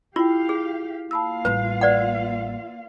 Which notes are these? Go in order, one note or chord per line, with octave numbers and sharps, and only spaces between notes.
E4 F4 G4 F5 G5
G#4
A#3 F4 F5 A5 B5 E6
A1 G3 B4
B4 D5 F#5